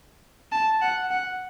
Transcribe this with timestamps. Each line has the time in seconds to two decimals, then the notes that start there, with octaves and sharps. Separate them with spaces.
0.52 A5
0.82 F#5
1.11 F#5